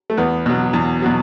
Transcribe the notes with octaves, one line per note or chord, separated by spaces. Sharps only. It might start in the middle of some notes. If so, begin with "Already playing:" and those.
A3
E2 B3
B2 F#3
E2
B2 F#3